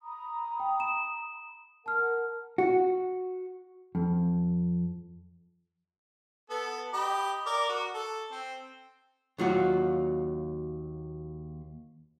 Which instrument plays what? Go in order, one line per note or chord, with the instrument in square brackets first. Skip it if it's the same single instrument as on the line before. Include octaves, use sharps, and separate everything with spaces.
[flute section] A#5 B5 D#6
[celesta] G5
E7
[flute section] A#4 F#5 [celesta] A5 F6
[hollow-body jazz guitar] F#4
F2
[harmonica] B3 A4
G4 D#5 B5
A#4 D5
F#4
A4
C4
[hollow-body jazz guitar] D#2 F#3 F4 F#4